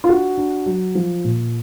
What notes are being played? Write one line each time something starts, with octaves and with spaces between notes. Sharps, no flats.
F4
D4 F#4
D4
F#3
F3
A#2